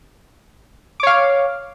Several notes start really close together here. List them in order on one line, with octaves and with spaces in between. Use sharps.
D6 C#5 F5